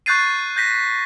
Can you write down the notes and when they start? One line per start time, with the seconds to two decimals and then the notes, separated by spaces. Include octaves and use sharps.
0.06 C#6 F#6 G6 A6 C7 D#7
0.56 G6 A#6 B6